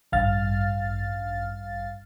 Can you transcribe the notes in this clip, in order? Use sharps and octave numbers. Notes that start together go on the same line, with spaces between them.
A1 G2 F5 F6 A6